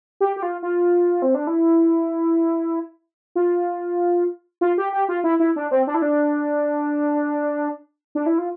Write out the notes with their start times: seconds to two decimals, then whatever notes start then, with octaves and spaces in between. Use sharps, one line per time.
0.21 G4
0.36 G4
0.43 F4
0.63 F4
1.22 C4
1.35 D4
1.47 E4
3.36 F4
4.61 F4
4.78 G4
4.93 G4
5.09 F4
5.24 E4
5.40 E4
5.56 D4
5.71 C4
5.87 D4
5.94 E4
6.02 D4
8.15 D4
8.26 E4
8.38 F4